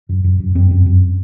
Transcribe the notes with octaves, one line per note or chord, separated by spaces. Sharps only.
F#2
F#2
F#2
F#2 C4
F#2
F#2